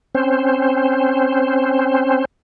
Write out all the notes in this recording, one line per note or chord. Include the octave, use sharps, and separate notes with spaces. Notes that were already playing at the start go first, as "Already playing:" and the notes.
C4 C#4 C5